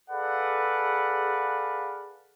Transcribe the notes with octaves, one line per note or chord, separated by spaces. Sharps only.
G#4 A4 B4 D5 F5 F#5